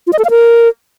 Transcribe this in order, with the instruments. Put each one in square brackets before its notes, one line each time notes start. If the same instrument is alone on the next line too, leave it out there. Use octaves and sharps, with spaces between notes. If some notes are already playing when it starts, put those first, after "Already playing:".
[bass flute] F4
D#5
A4
F5
A#4